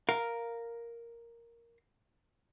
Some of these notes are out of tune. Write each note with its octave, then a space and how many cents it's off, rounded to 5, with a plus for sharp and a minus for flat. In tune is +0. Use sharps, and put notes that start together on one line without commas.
A#4 +0 F5 +0